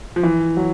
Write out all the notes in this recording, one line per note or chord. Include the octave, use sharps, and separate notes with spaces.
F3
E3
F#3